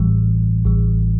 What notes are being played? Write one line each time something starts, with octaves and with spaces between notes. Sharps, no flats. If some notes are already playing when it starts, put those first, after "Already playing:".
Already playing: A1 A2 E3 G3
A1 A2 E3 G3